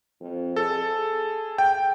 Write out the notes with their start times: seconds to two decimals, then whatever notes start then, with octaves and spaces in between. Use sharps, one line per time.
0.21 F2
0.56 G#4 A4
1.58 G5